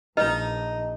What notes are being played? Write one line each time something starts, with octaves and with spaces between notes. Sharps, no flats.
A#1 D#4 B4 D#5